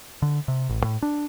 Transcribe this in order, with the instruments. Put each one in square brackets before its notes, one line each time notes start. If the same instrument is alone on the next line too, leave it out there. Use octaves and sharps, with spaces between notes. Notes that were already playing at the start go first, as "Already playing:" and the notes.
[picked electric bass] D3
C3
A1
A2
D4